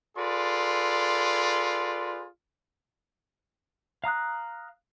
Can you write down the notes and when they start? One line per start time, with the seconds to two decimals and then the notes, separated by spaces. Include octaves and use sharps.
0.16 F4 G#4 A4 B4 D5 C6
4.04 F5 A#5 D#6 F#6